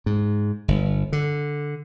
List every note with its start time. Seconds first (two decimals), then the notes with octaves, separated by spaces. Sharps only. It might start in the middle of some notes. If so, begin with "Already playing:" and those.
0.06 G#2
0.68 G1
1.12 D3